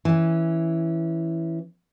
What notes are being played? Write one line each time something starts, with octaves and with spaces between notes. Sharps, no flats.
E3 C#4